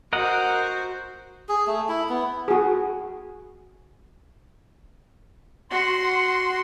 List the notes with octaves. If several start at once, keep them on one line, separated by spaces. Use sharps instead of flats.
F#4 A#4 C5 D#5 F#5
G#4
A3
E4
B3
F#4 G#4
F#4 C6